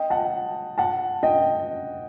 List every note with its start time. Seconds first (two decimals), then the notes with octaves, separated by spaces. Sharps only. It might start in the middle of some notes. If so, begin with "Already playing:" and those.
Already playing: D#5 G5
0.10 F#5 A5
0.78 F#5 A5
1.23 D#5 G5